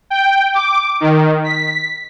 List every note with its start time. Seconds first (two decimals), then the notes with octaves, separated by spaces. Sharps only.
0.10 G5
0.54 D6
1.01 D#3
1.44 B6